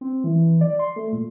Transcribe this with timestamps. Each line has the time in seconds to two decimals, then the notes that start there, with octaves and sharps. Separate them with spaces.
0.01 C4
0.24 E3
0.61 D5
0.79 C6
0.96 A3
1.13 A#2